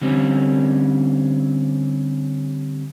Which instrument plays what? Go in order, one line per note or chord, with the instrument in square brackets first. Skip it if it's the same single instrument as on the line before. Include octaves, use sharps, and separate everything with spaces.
[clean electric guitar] D3 G3 C4 C#4